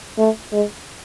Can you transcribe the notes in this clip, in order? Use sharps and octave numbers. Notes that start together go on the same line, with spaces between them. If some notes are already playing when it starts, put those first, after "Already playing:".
A3
G#3